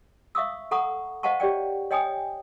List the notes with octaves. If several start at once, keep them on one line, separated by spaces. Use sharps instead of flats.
E5 F5 C#6 D#6 E6
A4 F#5 A#5 C#6 D#6
C5 D#5 F5 F#5 A5 C#6
G4 C#5 D5 G5
C#5 D#5 G5 G#5 D#6